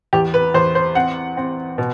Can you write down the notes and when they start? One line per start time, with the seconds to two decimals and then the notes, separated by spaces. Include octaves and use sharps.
0.13 E2 G4
0.34 B4
0.54 E2 C5
0.75 C5
0.95 C4 F#5
1.37 C4
1.78 B2